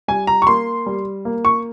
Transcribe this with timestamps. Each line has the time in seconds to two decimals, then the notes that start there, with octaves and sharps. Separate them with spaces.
0.08 G3 G#5
0.27 A#5
0.42 C#6
0.47 A#3 C6
0.86 G3
1.25 A#3
1.45 C#6